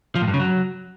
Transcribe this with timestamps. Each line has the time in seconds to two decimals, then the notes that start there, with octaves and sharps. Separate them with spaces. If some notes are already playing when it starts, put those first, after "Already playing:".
0.15 F3
0.22 A2
0.28 G2
0.34 C#3
0.40 F#3